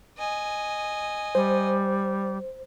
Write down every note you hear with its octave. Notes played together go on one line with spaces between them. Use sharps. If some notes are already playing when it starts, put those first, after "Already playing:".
D#5 G#5
G3 C5